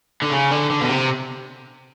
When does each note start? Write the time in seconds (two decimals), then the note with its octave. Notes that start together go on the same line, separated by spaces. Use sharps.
0.22 D3
0.32 C#3
0.51 D3
0.70 D3
0.81 B2
0.89 C3